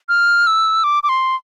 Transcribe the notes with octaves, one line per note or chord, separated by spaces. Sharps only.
F6
E6
D6
D6
C6